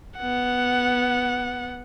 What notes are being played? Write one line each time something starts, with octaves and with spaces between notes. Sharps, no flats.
B3 F#5